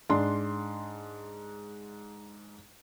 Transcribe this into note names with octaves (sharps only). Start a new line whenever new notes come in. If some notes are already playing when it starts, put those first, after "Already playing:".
G#2 D4 C6